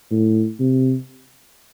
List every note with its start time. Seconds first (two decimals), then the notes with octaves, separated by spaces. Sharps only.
0.11 A2
0.60 C3